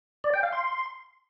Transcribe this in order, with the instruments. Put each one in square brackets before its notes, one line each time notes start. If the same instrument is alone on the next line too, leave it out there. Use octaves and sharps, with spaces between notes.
[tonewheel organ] D5
G5
F5
C6